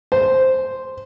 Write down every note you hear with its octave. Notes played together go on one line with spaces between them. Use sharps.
C5